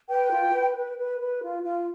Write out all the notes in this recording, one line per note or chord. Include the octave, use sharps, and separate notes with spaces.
B4 G5
F4
B4
B4
B4
B4
F4
F4